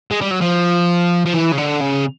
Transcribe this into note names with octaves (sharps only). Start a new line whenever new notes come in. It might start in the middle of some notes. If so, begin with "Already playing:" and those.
G#3
G3
F#3
F3
F3
E3
C#3
D3
C#3